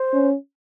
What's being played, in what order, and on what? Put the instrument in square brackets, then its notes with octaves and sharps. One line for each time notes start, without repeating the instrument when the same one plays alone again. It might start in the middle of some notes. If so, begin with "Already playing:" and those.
Already playing: [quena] C5
[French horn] C#4